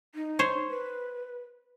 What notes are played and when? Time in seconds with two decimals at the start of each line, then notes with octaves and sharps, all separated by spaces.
0.15 D#4
0.39 C5 C#5
0.70 B4